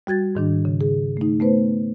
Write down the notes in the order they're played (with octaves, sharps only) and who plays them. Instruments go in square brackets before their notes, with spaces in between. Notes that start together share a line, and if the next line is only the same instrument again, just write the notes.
[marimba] G3 F#4 G#6 A6
G#2 D#3 D4
C#3
G#4
A3 D#4
A3 B3 B4 C5